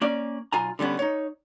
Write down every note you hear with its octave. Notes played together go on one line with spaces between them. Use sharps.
A#3 C#4 D5
B1 F4 G#5 A#5
D3 G3 B3 C#4
D#4 C#5